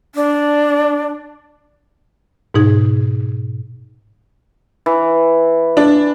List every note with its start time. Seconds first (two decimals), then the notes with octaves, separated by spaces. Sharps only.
0.15 D4
2.54 G#2 B2 D#4 G#4
4.86 E3
5.77 D4